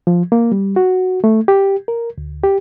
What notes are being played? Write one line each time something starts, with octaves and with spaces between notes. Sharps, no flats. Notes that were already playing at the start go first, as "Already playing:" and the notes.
F3
A#3
G3
F#4
A3
G4
A#4
D2
G4